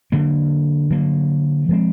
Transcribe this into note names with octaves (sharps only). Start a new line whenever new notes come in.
D3 F#3 A#3
D3 F#3 A#3
F3 G#3 C4